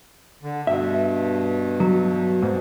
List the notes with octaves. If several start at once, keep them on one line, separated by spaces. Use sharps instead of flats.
D3
G2 B2 E5
F#3
G#2